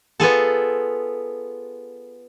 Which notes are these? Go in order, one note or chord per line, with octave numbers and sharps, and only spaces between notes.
B3 F4 G#4 A4